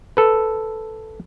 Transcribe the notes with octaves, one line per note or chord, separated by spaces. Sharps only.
A4 B4